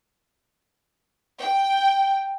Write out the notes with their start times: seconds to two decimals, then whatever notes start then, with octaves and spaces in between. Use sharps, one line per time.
1.38 G5